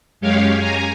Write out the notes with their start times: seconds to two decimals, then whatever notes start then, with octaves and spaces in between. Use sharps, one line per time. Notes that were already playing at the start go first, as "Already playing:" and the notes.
0.21 F#2 G#3 G4 C#5 F5
0.58 G#5 A#5